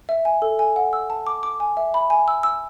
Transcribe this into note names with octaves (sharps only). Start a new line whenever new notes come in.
E5
G#5
A4
G#5
F#5
E6
A5
D6
D6
G#5
E5
B5
G#5
E6
E6